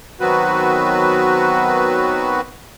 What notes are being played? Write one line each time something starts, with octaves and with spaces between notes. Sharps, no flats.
D#3 F#3 B3 C4 F#4 B4